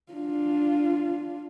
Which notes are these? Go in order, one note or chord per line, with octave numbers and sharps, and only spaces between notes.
D4 F4